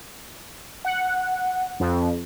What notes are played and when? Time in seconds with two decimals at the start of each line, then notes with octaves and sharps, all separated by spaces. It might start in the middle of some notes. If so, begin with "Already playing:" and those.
0.85 F#5
1.80 F2